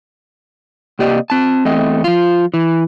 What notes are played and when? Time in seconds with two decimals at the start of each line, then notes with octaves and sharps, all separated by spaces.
0.99 C3 A#3 G4 D5 D#5
1.30 C4 A5
1.65 E2 A3 C4 D#5
2.04 F3 F4
2.54 E3